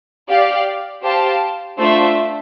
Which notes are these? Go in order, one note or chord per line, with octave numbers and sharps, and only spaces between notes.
G4 D5 F5
G4 C5 F5 A5
A3 D4 F4 C5 E5